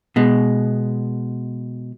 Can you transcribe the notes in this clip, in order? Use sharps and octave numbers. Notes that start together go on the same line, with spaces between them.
B2 G#3